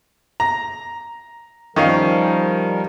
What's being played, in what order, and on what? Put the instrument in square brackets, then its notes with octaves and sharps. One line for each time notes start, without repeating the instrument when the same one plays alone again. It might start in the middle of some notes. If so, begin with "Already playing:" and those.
[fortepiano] A#5
[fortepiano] D#3 C#4 F5 [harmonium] F3 G3 A#4